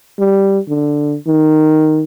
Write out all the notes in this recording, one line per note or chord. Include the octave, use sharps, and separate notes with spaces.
G3
D3
D#3